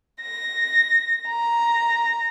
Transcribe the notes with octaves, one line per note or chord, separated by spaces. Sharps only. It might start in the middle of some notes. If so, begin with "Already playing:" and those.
A#6
A#5